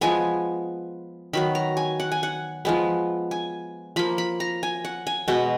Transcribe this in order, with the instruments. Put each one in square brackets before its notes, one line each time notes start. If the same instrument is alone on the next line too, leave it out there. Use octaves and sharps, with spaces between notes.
[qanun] F3 G#3 B3 G#5
D#3 F#3 B3 B5
A#5
G#5
F#5
G#5
F#5
F3 G#3 B3
G#5
F3 A#3 B5
B5
A#5
G#5
F#5
G#5
B2 G#3 B3